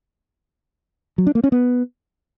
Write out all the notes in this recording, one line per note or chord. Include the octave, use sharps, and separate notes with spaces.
F#3
D4
A#3
C#4
B3